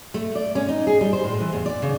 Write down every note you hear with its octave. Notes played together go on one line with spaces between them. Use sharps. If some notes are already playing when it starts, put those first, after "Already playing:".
A3
D5
C#4
D#4
G#4
G3
C5
A2
E3
E2
D5
C#3